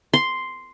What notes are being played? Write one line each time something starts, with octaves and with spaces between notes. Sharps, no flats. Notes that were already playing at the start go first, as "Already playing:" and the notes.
C6